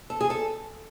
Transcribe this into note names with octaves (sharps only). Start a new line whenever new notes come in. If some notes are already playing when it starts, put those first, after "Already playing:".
A4
G#4
A4